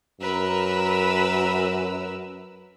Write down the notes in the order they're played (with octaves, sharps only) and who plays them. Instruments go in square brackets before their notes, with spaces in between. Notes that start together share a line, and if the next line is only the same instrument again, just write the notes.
[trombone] F#2 [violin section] A#4 B4 E6